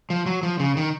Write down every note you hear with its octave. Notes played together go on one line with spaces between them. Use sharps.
F3
F#3
F3
C#3
D#3